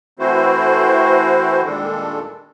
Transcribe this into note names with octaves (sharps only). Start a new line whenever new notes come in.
E3 A3 C4 E4 F#4 C5
A#2 D#3 G3 G#3 D4 A4